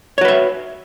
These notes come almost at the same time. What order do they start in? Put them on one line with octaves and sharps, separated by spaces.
C#5 F#4 B4 E5